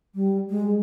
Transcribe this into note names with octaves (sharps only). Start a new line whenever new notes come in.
G3
G#3